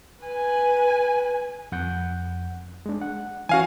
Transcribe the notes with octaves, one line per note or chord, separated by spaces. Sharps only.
B4 G#5
F2 F#5 G6
G#3 D4
F#5
E3 C#4 F#4 F5 G#5